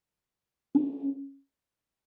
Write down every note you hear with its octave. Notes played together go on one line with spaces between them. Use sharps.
C#4